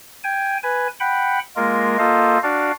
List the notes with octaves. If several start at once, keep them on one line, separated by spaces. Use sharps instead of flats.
G5 G#5
B4 G#5
F#5 G5 B5
G#3 A#3 F4 A#4
A#3 F4 A4 C5 D#5 F5
D4 F#4 D5 F5